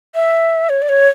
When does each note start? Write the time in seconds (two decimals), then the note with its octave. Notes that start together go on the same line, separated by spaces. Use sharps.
0.15 E5
0.69 C#5
0.82 D5
0.89 C#5